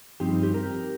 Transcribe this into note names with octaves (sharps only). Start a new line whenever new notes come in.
G2 F3 C4 D#4 G4
G4
G4 A#4